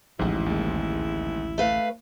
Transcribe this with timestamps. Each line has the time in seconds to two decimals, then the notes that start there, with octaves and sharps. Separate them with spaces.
0.19 A1 D2 G#2 F3 E4
0.46 D#2 G#3
1.58 A3 B4 F5